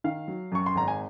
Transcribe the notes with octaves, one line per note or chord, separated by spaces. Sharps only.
D#3 F5
F#3
F#2 C#6
C6
G#1 A#5
G#5